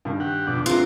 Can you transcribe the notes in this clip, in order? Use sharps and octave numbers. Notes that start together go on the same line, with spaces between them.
G2 D#3
G4 F#5
F2 B2 D4
D3 C4 F4 G#4 A#4 F#6